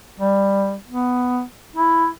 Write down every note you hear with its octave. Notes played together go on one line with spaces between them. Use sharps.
G3
B3
E4